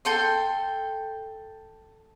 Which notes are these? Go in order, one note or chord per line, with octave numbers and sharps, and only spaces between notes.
A4 G5 C6